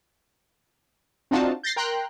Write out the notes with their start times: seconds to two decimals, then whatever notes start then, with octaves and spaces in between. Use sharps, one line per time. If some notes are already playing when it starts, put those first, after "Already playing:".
1.31 C4 D4 D#4 F4 F#4 A5
1.63 G6 A6 A#6 C7
1.76 A#4 G5 A#5 C6 F#6